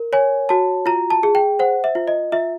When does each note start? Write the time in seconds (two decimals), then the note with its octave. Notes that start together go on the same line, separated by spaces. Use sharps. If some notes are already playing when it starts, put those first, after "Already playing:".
Already playing: A#4
0.13 C#5 G#5
0.49 F#4 A5
0.86 F4 A#5
1.10 A5
1.23 G#4
1.35 G5
1.59 C5 F#5
1.84 E5
1.95 F4
2.08 D#5
2.32 F4 E5